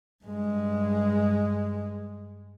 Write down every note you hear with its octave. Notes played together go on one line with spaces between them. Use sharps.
G2 G#3